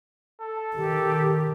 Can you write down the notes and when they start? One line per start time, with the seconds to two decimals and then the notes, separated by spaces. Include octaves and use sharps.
0.42 A4
0.76 D#3 G4